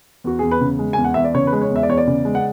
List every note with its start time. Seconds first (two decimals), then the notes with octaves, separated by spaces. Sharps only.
0.24 E2 F#4
0.39 E2 G#4
0.51 B4
0.61 C#3
0.79 G#3
0.93 E2 G#5
1.04 F#5
1.14 E2 E5
1.24 D5
1.34 C#3 C#5
1.47 B4
1.53 G#3
1.62 C#5
1.70 E2
1.76 E5
1.83 D5
1.89 E2 C#5
1.98 D5
2.07 C#3
2.25 G#3
2.35 F#5